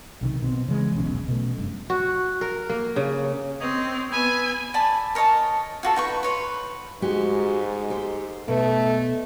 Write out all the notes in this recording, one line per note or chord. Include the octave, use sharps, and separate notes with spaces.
B1 C3 D#3
B2 C4
C#3 E3 G#3
D#1 B1 E2 C#4
B2 A3
F1 G2
F#4
A#4
A#3
C#3
C4 C#5 D#5 D#6
B3 G#5 B5 E6
D5 G#5 A5 B5
A#4 C#5 D#5 A5
F4 F#4 A4
D#4 B4 C#6
B4 C#5 C6
G#2 G#3 F#4 G4
G4 A4 C5
B2 A3